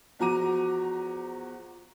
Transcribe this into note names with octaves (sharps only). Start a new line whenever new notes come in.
E2 F3 F#4 A#5 D6 D#7